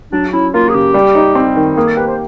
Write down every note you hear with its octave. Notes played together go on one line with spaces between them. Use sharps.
F#3 D4
C#4 E4
A#3 F4
G#4
C#3 G4
G3
D#4
C4
D#3
A#3 G#4
A4
G4 B4
C5